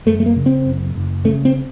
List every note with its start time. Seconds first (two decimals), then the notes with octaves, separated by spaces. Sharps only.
0.06 F#2 A3
0.20 A3
0.26 A#3
0.36 C#3
0.46 C4
0.65 F#1
0.96 F#1
1.25 C#3 A3
1.45 C4